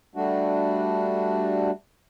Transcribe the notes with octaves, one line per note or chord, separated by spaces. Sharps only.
G3 A3 D4 F#4